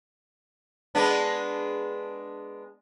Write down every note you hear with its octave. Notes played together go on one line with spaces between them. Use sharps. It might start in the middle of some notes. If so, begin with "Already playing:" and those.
G#3 B3 D4